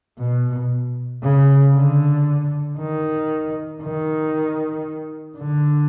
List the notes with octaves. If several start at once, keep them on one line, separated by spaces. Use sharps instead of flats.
B2
C#3
D3
D#3
D#3
D3